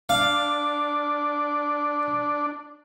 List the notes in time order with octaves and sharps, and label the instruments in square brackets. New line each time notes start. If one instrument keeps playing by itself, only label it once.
[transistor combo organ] D4 [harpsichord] F5